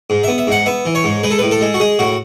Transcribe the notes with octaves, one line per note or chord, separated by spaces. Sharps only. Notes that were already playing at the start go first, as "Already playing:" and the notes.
G#2
B3 E5
E5
G#2 F#5
B3 E5
E3
C#5
G#2
G#3 B4
A4
A2 B4
A4
G#3
F#4
G#3 G#4
A2 F#4